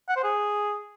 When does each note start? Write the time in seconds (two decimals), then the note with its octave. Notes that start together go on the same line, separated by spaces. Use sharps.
0.09 F#5
0.16 C5
0.24 G#4